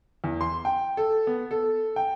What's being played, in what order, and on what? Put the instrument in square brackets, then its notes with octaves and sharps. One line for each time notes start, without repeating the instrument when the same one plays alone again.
[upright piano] E2
C6
G5
A4
B3
A4
G5